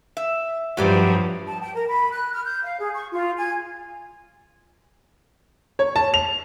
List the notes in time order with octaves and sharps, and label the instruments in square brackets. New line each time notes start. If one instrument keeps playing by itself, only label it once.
[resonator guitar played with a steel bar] E5
[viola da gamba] G2 F3 [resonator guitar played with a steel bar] F#3 G4 D5
[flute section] A5
G5
A#4
B5
F#6
F6
G6
F5
G#4
C#6
F4
G#5
[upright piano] C#5
A5
F7